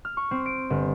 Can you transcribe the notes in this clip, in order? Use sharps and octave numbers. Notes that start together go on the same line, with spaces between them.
F6
C#6
C4
D7
G1